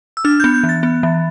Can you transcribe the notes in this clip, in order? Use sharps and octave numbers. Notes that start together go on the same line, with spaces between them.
E6
D4 F6
B3 G6
G6
E3
A6
B3
E3